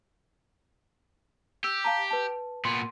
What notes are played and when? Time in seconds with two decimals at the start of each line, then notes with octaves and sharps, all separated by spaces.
1.64 G4 E6
1.84 F5 A5 A#5
2.11 B4 A5
2.65 A#2 B3 C6